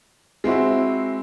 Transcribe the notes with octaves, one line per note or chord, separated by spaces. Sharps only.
G#3 C4 E4 F#4